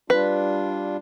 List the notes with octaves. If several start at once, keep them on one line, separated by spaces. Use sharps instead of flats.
G3 D4 F4 B4